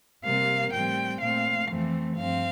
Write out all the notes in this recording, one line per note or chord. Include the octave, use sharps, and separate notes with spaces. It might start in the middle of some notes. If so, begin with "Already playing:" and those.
C3 G3 A#3 F5
A2 G3 C4 G5
A#2 A3 C4 F5
F2 E3 A3 C4
G2 F3 C4 F5